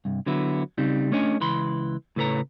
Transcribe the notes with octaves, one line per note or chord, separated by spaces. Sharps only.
C2 G2
D3 F#3 B3 E4
C#3 G3 C4 D#4
A3 C#4 D4 C#5 D#5 G#5
C#2 E3 B5 C6
A2 C#3 A4 B4 C#5 A#5